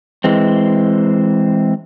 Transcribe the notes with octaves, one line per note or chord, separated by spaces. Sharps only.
E3 G#3 C4